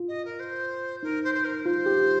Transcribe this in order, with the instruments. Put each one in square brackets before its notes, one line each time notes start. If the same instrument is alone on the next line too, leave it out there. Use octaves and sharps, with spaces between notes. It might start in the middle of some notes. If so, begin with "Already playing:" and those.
Already playing: [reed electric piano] F4
[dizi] D#5
A#4
C5
[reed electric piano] D#4 [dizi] A#4
[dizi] C5
C5
A#4
[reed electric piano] F4 [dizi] C5
[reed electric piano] G4